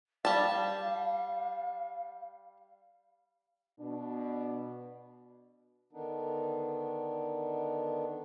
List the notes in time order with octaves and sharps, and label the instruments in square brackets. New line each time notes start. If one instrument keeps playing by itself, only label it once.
[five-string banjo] G3 A5 [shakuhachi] F5
[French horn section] B2 D4
[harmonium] D3 D#3 B3 D4 D#4